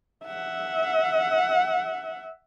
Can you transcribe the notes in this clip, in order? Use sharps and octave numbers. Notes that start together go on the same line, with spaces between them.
E5 F#5